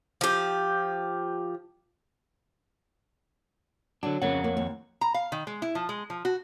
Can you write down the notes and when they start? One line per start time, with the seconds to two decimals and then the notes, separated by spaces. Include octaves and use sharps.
0.21 F3 G4
4.03 D3 F#3 D4
4.22 F2 C#3 A#3 C#5 F#5
4.44 A#3
4.57 D#2
5.01 A#5
5.14 F5
5.32 D#3
5.47 G#3
5.62 E4
5.75 F3
5.89 G#3
6.10 F3
6.25 F#4